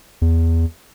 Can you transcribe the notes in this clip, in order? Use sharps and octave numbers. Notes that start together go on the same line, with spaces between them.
E2